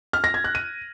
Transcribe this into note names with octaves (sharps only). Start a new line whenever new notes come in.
F6
A#6
G#6
F#6
D#7